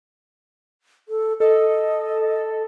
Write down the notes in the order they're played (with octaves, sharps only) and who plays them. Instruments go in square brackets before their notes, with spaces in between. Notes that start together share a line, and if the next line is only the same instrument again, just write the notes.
[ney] A4
[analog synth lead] A4 [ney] D#5